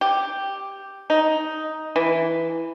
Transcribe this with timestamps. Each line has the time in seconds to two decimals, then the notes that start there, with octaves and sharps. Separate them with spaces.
0.01 G4
1.10 D#4
1.96 E3